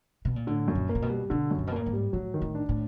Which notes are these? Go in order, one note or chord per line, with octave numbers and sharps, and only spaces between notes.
B2
A#2
A2 D3
F#2
A#2
A#3
A#2
B2
G3
B2 D3
F#2
A#2
B2
A#2 A#3
G#2
G3
A2 F#3
D#3
A2
D4
A2